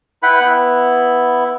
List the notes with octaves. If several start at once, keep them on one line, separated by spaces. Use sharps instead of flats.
E4 B4 F#5 G5 B5
B3 E4